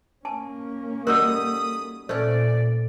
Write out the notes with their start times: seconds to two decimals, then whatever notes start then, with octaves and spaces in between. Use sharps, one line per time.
0.25 A#3 C#4 G#5 A5
1.07 G3 D#4 F#4 A4 A#4 B5 D#6 E6
2.09 A#2 A3 C#4 C5 D5